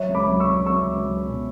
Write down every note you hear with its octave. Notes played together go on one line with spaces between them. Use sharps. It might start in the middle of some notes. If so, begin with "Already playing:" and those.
Already playing: F#3 C#5 E5
C#2
B5 D6
F#3
C#6 E6
F#3
F#3 C#6 E6
C#2
F#3
B2